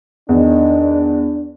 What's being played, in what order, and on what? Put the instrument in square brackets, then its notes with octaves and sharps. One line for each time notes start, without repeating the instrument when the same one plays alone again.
[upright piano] E2 [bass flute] D#3 [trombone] D4